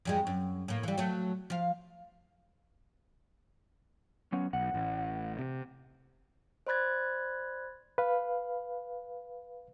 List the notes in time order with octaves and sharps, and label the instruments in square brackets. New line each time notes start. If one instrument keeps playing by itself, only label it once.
[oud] F2 G3 G#3
F#2
A2 A#3
E3 G3
F#3 A3
F3 F5
[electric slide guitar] F#3 B3 C#4
[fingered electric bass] B1 [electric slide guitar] F#5
[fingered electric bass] A1 A2
C3
[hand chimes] C5 D5 B5 F#6 G#6 A6
[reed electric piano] B4 F5